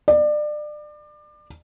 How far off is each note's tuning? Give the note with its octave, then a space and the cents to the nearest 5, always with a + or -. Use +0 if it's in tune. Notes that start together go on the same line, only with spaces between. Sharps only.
D5 +30